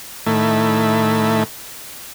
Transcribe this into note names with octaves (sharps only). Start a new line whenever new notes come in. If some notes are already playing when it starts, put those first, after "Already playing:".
A2 D#3 A3 E4